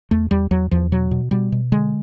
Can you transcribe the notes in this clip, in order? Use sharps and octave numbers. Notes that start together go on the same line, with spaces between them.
E2 A3
E2 G3
E2 F#3
E2 F3
B2 F#3
B2
B2 G3
B2
D3 G#3